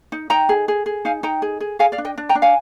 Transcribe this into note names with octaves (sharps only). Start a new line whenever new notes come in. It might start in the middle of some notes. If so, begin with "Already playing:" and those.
D#4
D#4 G5 A#5
G#4
G#4
G#4
D#4 F5 G#5
D#4 G5 A#5
G#4
G#4
G#4 F5 G#5
D5 F5
D4
D#5 G5
D4
G5 A#5
D4
F5 G#5